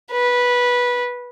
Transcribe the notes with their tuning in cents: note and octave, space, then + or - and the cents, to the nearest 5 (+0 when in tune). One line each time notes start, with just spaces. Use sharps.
B4 -15